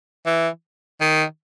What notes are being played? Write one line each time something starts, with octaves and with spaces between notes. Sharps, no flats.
E3
D#3